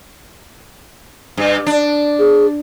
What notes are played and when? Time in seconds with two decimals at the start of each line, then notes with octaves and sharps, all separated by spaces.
1.37 G2
1.66 D4
2.19 G#4